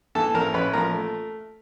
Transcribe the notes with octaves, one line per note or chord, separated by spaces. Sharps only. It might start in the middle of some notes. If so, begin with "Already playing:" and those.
E3 A4 A5
A1 A#4 A#5
A1 B4 B5
F3 A#4 A#5
A3